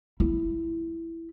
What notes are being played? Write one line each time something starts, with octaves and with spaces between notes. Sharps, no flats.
E4